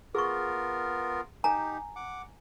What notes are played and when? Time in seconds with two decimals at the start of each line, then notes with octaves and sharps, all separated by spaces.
0.15 B3 F4 G#4 A#4 C#6
1.44 D#4 G4 G#5 A#5
1.96 F#5 D6